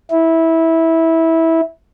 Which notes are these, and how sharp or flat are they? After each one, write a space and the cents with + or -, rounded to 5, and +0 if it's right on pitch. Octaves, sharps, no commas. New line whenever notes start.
E4 -15